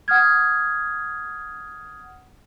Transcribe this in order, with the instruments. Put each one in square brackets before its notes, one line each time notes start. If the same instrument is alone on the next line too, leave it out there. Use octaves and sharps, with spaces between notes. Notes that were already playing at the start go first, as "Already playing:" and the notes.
[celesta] F#5 D#6 F6 G#6